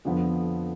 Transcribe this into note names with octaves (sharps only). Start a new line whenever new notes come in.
F2 D3 F3 B3